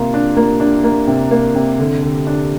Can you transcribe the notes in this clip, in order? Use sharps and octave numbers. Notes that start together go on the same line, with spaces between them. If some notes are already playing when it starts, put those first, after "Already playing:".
Already playing: C3 A#3 F4
D4
A#3
D4
A#3
C3
A#3
C3
D3
D3
D4